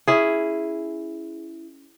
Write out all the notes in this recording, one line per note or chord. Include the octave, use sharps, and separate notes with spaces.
C#4 E4 G#4